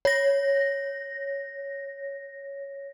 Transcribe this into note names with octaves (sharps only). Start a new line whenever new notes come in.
C#5 A#6